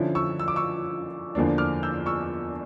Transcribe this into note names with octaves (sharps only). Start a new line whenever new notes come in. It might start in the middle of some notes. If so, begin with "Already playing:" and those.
Already playing: D3 F3 C#4 E4
C#6 E6
E6
D6
C#6 E6
E2 D3 F3 A#3 D4
D6 F6
E6 G6
C#6 E6